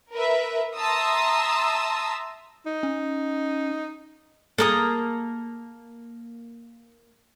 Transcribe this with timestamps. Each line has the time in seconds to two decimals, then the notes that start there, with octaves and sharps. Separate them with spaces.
0.13 A#4 B4 E5
0.77 E5 A5 A#5 C6 D#6 E6
2.66 D#4
2.83 C#4
4.58 A#3 G#4 A4 A#5 D#6